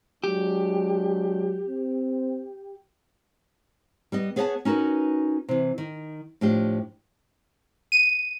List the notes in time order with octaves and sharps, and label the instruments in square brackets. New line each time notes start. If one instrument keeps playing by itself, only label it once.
[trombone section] F#3 G#3 D4 [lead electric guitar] G4
[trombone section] C4
[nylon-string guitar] G3 B3 D#5
B3 G#4 C#5 D5 F#5 A5
C#4 D#4 F#4 A#4 B4
C3 E3
D#3
A2 F3 D4 F4 G4
[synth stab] D#7